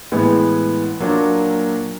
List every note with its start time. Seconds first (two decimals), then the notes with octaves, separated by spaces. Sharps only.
0.12 A2 E3 G#3 B3
1.00 A#2 F#3 A#3 D4